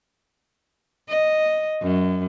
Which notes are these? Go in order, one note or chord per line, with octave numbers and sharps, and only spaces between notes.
D#5
F#2